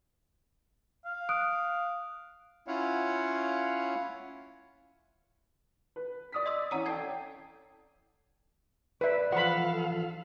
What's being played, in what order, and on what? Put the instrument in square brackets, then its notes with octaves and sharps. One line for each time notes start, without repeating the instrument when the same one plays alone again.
[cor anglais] F5
[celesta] D#6 F#6 D7
[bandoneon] C#4 E4 F4 C#5 F5 F#5
[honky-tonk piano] B4
D5 D#6 B6
[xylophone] D#5 C6 E6
[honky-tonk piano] E3 C#4 [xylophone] F#5 A#5 D#6
[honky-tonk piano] A4 D5 G5 [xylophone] G#6 C7
[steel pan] B4 E5 [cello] D5
[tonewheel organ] E3 F3 F4 [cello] A4 F5 [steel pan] F#5 B5